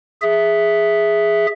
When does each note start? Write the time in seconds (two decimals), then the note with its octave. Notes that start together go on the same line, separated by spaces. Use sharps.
0.22 G#4 E5